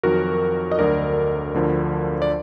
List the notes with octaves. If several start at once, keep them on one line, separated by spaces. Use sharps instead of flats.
F2 D#3 F#3 F#4 A#4
D#5
D2 D3 F#3 A#4 D5
D2 D3 F3
D5